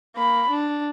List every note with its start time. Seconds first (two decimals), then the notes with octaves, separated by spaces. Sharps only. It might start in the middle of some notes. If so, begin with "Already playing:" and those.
0.16 A#3 B5
0.50 D4